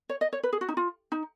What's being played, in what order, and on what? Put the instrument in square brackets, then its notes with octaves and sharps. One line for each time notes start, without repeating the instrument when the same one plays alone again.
[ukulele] C#5
D#5
C#5
B4
G#4
F#4
D#4
F4
D#4